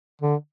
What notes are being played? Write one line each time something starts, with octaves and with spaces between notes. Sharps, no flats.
D3